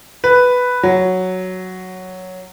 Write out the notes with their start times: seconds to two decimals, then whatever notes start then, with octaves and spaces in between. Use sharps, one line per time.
0.24 B4
0.83 F#3